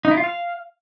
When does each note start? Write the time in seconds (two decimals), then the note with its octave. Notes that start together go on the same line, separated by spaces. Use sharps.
0.05 D#4
0.11 E4
0.17 F4
0.24 F5